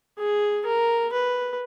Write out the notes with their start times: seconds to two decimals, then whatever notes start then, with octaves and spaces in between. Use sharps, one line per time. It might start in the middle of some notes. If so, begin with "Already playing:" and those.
0.19 G#4
0.66 A#4
1.13 B4